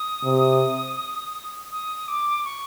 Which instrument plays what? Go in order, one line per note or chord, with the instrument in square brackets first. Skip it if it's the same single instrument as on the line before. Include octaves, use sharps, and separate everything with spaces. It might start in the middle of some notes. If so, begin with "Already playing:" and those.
Already playing: [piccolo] D#6
[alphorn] C3
[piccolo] D#6
D6
C#6